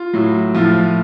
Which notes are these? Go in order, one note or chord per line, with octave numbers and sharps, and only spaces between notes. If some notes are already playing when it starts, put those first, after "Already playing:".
Already playing: F4
A2 F#3
A2 F3 F4